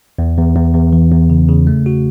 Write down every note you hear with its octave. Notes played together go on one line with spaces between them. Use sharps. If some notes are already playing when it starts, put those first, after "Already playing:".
E2
E2
E2
E2
E3
E2
C#3
C#3
A3
F#4